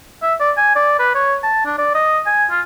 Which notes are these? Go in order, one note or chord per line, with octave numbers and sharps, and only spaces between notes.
E5
D5
G#5
D5
B4
C#5
A5
D4
D5
D#5
G#5
F4